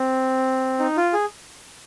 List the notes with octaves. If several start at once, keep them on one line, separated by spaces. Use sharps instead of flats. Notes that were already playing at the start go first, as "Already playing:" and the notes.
Already playing: C4
D#4
F4
G#4